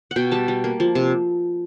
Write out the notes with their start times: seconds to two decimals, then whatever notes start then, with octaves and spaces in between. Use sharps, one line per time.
0.11 F#5
0.16 B2 G5
0.32 G3 A5
0.48 G3
0.64 A#3
0.80 F3
0.95 C3